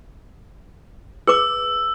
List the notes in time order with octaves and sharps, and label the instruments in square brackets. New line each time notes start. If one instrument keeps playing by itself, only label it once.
[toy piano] G#4 B4 D6 [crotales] E6